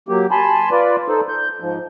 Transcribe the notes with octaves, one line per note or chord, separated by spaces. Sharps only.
F#3 A#3 G4
G#5 A5 B5 C6
F4 B4 D5
D#4 A4 C5
G6
G#2 F3